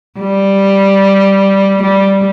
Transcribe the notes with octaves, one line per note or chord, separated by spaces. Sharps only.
G3
G3